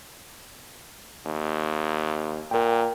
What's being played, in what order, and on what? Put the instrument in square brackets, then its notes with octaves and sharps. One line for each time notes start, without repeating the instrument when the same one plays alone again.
[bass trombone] D#2
[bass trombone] A#2 [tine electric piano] A#4 G5